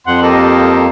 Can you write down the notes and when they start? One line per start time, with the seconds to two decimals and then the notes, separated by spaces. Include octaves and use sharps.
0.07 F2 F#5 C6
0.22 A#3 G4 A4 A#4 D#5